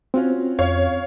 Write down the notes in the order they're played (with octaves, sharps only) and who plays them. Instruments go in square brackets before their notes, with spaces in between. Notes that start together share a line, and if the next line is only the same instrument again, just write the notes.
[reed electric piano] C4 [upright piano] C#4 F4 F#4
[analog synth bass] F2 [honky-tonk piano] C#5 F5